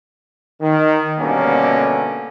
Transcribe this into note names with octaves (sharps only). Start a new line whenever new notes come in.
D#3
B2 D3 G3 A3 A#3 C#4